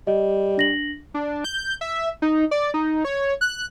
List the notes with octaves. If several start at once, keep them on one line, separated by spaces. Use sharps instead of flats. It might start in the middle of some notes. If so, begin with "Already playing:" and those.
G3 D#5
D4 A#6 F#7
D4
G6
E5
D#4
D5
D#4
C#5
F#6